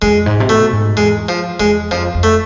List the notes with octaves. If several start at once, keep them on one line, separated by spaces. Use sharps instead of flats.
F2 G#3
G#2
C3
B2 A3
G#2
E2 G#3
F3
E2 G#3
F2 F3
F2
A3